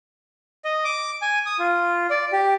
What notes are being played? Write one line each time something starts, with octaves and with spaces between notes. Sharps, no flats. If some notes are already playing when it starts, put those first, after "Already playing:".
D#5
D6
G#5
D#6
F4
D5
G4